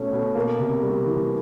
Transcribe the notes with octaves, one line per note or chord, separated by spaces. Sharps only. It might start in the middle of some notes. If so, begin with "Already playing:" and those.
Already playing: B2 A3 C#4
B2
A#3
C3
G3
E3